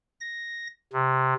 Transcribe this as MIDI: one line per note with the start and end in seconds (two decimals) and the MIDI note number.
0.20 0.67 94
0.93 1.34 48